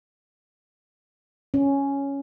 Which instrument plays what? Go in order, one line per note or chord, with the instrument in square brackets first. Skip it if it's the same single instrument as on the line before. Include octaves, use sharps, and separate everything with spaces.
[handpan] C#4